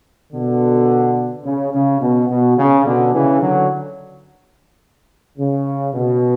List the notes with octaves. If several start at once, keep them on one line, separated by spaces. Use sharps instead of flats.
B2 D3
C#3
C#3
B2
B2
C#3
B2 D3
C#3 E3
D3 F#3
C#3
B2